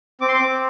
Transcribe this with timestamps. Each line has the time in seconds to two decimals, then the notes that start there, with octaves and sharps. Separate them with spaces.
0.21 C4 D6
0.28 C6
0.35 C4 D6